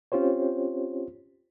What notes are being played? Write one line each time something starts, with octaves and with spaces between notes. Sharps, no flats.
C4 C#4 F4 G4 C5 C#5